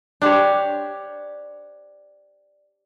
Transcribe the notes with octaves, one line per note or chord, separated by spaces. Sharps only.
D4 G4 C5 C#5